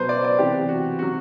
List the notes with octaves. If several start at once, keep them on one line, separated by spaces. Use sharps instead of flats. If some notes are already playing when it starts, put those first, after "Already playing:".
Already playing: B2 F#3 B4 C5
D5
D5
C3 E3 G4
F#4
C3 F#3 F#4